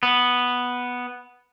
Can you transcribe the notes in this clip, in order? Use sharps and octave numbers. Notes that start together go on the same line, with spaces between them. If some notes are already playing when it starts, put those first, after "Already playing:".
B3